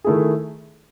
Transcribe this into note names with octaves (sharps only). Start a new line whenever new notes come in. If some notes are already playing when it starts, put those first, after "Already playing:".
D#3 A3 E4 G#4